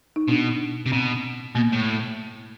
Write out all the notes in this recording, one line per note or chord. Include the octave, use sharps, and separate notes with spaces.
D#4
B2 D4
C3
B2 C4
B2 A#3
A2